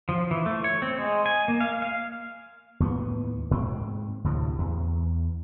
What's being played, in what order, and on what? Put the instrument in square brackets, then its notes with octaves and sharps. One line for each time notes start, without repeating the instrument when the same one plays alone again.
[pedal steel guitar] F3
E3
A3
C#5
C4
G#3
G#5
A#3
F5
F5
[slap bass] D#2 A2 A#3 B3
G#2 C4
D2 A2 C3
E2